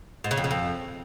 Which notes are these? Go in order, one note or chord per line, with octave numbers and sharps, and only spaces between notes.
G#2
C#3
F2
C#3
F2